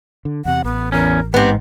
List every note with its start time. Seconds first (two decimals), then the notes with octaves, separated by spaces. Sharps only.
0.25 D3
0.45 E2 C3 F#5
0.64 A1 B3
0.92 E2 C#4 A#4
1.34 G#2 B3 C4 G4